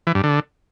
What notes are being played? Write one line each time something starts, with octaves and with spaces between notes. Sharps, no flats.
E3
G2
D3